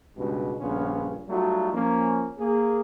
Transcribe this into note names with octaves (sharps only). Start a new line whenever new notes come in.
C#2 G2 B2
A#1 G2 C#3 B3 C#4 F4
F#3 G3 A3 D#4 F4 F#4
F3 A#3 C#4
A#3 G#4